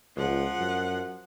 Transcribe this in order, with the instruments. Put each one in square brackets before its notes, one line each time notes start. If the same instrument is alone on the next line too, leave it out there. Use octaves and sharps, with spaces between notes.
[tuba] C#2 [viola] F3 F#5
[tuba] F#2